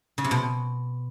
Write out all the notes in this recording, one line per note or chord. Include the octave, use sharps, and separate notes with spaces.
C#3
C3
B2